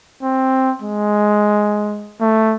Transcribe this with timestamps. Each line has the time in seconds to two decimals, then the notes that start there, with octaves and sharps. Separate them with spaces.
0.22 C4
0.82 G#3
2.20 A3